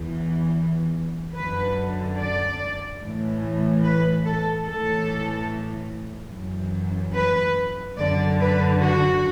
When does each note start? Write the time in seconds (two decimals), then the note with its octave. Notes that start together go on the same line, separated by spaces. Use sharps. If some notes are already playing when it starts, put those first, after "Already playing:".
Already playing: E2 E3
1.36 F#2 D3 B4
2.19 D5
3.02 A2 E3
3.84 B4
4.26 A4
4.67 A2 E3 A4
6.32 F#2 E3
7.16 B4
7.98 F#2 D3 D5
8.40 B4
8.81 F#4